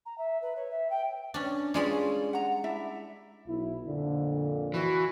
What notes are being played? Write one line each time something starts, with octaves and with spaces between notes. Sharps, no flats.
A#5
E5
B4
C#5
E5
G5
C#4 D4
G3 G#3 C#4 F4 G#4 D5
F#5 A#5
D4 E4 E5
B1 E4
F2 A#2 D3
E3 F#4